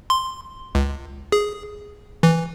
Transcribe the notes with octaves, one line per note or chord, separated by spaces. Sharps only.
C6
C#2
G#4
E3